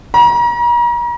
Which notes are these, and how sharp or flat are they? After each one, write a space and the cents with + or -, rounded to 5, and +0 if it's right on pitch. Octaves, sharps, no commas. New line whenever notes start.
A#5 +40